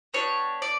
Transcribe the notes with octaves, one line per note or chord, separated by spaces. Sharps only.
B3 D4 G4 C#5
D5